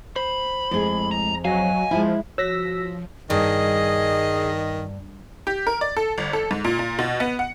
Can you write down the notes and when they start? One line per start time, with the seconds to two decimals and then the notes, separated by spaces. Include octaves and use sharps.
0.16 C5 B5
0.71 F2 A2 G3 G#3 G#4
1.11 A#5
1.45 F#3 D#5 F5 G#5
1.91 F3 G#3 E4
2.38 F3 F#4 C#5 E6 A#6 B6
3.30 G2 D#3 G#4 D#5
5.47 G4
5.67 A#4
5.81 D5
5.97 A4
6.18 G1
6.33 A4
6.51 G#2
6.65 A#2
6.79 A#2
6.99 B2
7.20 B3
7.39 F#5